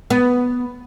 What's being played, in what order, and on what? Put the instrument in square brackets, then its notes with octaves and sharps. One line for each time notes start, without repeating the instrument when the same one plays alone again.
[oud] B3